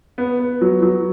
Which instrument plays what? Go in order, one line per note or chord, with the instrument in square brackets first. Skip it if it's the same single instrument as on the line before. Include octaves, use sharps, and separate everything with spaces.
[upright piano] B3
B3
F#3
F#3